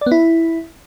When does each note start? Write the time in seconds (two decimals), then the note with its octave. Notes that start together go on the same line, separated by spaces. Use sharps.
0.01 D5
0.06 B3
0.11 E4